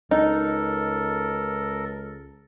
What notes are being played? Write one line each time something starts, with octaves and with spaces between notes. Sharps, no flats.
C#2 D#4 A4 A#4